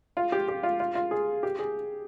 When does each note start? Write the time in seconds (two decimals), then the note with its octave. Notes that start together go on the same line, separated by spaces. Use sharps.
0.17 F4
0.32 G4
0.48 G4
0.63 F4
0.80 F4
0.95 F4
1.11 G#4
1.43 G4
1.59 G#4